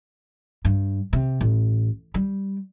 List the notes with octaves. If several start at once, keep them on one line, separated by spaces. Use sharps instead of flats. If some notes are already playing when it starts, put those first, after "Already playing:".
G2
C3
A1
G3